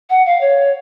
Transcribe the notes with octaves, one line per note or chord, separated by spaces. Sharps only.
F#5
F5
C#5